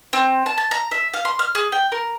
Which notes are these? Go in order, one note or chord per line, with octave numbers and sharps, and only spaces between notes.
C4
A5
A5
A#5
E5
F5
C6
F6
G#4
G5
A#4